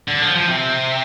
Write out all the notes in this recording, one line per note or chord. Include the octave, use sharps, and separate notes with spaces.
D3
F3
F3
C3